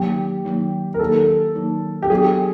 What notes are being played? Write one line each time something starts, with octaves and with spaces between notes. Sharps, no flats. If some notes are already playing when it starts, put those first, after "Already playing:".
Already playing: D#3 F#3 A#3 D#4 G4
D#3 F#3 A#3 D#4
A#4
D#3 F#3 A#3 D#4 A4
D#3 F#3 A#3 D#4
G4
F#3 B3 D4 F#4 G#4 A4